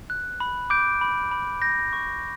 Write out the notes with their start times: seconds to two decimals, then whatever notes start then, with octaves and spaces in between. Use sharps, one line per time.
0.10 F#6
0.40 B5
0.70 D6 G6 D7
1.01 B5
1.31 B5
1.62 G6 A#6
1.93 C#6